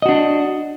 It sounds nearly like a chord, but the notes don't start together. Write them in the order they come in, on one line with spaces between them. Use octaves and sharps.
D#5 F#4 D4